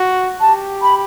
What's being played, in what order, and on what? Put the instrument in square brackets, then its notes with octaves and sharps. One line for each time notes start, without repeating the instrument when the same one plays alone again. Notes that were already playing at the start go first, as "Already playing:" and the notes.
Already playing: [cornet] F#4
[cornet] G4 [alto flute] A5
[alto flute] B5